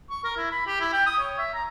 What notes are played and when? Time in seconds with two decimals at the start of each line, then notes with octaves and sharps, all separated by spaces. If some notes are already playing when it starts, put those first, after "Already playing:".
0.09 C#6
0.24 A#4
0.36 E4
0.51 B5
0.66 G4
0.80 E4
0.93 G5
1.06 D#6
1.19 C#5
1.38 E5
1.54 A#5